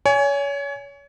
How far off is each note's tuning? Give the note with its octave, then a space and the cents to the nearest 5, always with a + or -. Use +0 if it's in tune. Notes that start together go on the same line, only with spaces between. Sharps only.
C#5 +30 G#5 +0